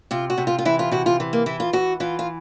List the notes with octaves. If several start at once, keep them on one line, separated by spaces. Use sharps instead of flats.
C3 F4
F#4
C3
F4
F4
E3 E4
F4
C3 F#4
F4
E3
A#3
E3 E4
F4
E3 F#4
E3 F4
F4